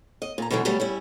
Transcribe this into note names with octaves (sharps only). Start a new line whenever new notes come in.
D#5
A#2 A#5
B2 D3 E3 F#3 G#3
C#3 F#3 G3 A3 B3 G4
G3 C#4 E4